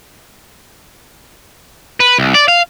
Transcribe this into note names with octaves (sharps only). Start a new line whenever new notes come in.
B4
C2
D5
F5